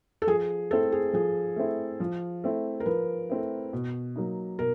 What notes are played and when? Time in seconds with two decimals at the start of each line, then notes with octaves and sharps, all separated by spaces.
0.22 A4
0.27 F3 G#4
0.71 A3 C4 E4 A4
0.92 G#4
1.13 F3 G#4
1.56 A3 C4 E4
2.00 F3
2.44 A3 C4 E4
2.80 A#4
2.86 F3 B4
3.30 A3 C4 E4
3.73 B2
4.16 F#3 A#3 D#4
4.59 B2 A#4